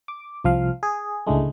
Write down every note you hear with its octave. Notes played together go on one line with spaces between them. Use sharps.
D6
C2 F3 F5
G#4
C#2 A2 D3 G#3 A3